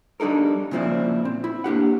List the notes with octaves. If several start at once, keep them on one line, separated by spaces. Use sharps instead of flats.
G3 D4 D#4 A4 A#4
A#2 C#3 F3 C4 E4 D5
C4
E4
A#3 D4 G4 F#5